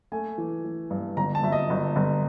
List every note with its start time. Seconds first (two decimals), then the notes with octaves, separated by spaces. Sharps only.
0.12 A3 G#5
0.38 E3
0.64 E3
0.91 G2
1.17 G1 A#5
1.35 A5
1.43 G1 E5
1.52 D#5
1.70 G1
1.96 G1